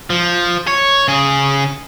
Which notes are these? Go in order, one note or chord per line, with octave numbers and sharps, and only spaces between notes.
F3
C#5
C#3 G#4